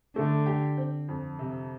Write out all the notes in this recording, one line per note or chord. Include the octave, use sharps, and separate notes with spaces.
D3 A3
G4
C4
F2
C3